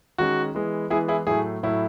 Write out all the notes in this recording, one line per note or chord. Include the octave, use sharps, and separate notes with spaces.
D#3 G#3 C#4 F#4
E3 G#3 B3
E3 G#3 B3 E4 G#4
E4 G#4
A2 F#3 A3 E4 G#4
A2 F#3 A3 E4